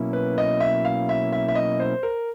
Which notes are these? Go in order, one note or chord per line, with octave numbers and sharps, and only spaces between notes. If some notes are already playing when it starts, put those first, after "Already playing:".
Already playing: B2 F#3 A#3 C#4 E4
B4
D#5
E5
F5
E5
E5
E5
D#5
C5
A#4